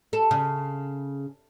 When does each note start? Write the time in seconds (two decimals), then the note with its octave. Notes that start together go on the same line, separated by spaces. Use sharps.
0.13 A4
0.31 C#3